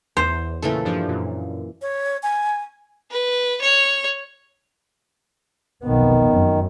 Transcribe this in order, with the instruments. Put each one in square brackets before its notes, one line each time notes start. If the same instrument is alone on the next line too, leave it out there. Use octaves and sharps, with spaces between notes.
[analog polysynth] E2 [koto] C5
[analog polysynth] A#2 C#3 A3 [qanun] E3 A#3 A4
[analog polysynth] G2 F3 D4
F#2 A#2
[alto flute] C#5
G#5
[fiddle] B4
C#5
[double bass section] F1 B1 B3 [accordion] D#3
[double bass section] F#2